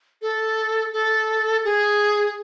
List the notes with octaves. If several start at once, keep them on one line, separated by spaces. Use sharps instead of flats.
A4
A4
G#4